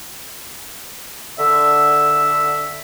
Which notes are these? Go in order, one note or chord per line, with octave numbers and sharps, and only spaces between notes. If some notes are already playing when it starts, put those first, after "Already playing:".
D3 E5